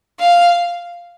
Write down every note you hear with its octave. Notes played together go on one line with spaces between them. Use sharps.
F5